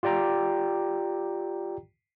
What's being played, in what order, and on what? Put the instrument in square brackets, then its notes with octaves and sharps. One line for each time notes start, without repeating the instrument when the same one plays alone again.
[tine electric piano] F4 G4 D5 G5 A#5